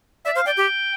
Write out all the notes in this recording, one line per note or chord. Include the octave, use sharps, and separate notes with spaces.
D5 E5
C5 F5
D5 G5
G4